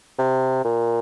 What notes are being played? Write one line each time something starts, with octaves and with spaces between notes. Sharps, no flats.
C3
A#2